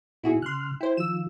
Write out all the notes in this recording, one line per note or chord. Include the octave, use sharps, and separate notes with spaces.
A#2 B3 D#4 E4 F#4 G#4
C#3 C6 F6 F#6
E4 C5 G5
D#3 F3 F4 E6 E7